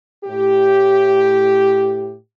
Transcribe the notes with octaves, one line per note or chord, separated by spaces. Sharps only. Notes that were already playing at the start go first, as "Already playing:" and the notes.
A2 G4